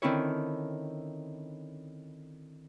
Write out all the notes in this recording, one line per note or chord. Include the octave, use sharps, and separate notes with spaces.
D3 D#3 C4 C#4 E4 C#5